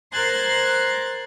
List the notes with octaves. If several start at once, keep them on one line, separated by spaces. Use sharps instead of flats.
A#4 C5 C6 F#6 G#6 A6